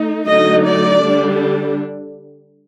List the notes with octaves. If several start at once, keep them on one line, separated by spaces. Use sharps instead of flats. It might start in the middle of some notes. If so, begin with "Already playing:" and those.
Already playing: A3 D#4
D3 F#3 A3 D#4 D#5
D5
D3 G3 D4